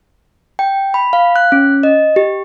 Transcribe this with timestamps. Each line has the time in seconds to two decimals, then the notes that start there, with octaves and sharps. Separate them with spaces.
0.59 G5
0.94 B5
1.13 F5
1.36 F#6
1.52 C#4
1.83 D#5
2.16 G4